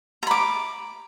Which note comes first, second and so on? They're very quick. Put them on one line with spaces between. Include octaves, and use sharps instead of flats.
A#5 B5 D6